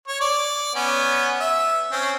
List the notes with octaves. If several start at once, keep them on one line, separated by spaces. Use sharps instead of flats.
C#5
D5
B3 C#4
E5
C4 C#4